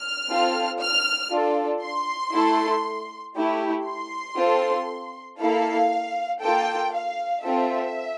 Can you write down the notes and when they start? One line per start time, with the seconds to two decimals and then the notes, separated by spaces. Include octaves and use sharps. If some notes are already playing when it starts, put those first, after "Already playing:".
Already playing: F6
0.30 C4 F4 A4
0.81 F6
1.31 D4 F4 A4
1.82 C6
2.33 A3 E4 A4
3.36 A3 E4 G4
3.86 C6
4.37 C4 F4 A4
5.39 A#3 E4 A4 F5
6.41 A#3 F4 A4 G5
6.93 F5
7.43 C4 F4 A4 E5